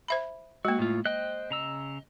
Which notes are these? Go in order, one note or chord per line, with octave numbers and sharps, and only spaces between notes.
C5 E5 B5
G#3 A#3 F#4
A2 F4
C5 D#5 G5 F#6
C#3 A#5 E6